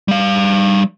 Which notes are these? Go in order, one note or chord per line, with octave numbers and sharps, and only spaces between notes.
G3 F5